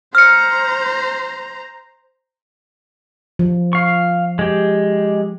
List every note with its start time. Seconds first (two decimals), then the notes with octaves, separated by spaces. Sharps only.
0.15 C5 A#5 F6 C#7
3.39 F3
3.73 F5 C#6
4.39 G#3 G4